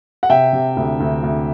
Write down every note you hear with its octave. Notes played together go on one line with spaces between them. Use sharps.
F#5
C3 E5 G5
C3
D2
D2
D2